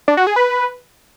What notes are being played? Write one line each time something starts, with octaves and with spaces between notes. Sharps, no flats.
D4
F#4
G#4
B4